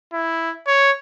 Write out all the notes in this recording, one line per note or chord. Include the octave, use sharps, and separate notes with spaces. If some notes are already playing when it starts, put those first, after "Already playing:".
E4
C#5